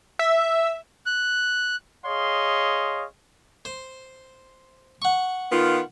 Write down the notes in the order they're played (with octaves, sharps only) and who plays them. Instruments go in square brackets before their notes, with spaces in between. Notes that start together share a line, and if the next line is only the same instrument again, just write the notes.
[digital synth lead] E5
[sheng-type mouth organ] F#6
[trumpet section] G#4 C#5 D#5 F5 C6
[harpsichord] C5
F#5 C#6
[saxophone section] D#3 B3 F4